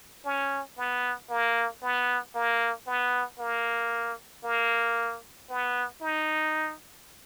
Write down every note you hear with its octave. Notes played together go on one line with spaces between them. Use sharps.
C#4
B3
A#3
B3
A#3
B3
A#3
A#3
B3
D#4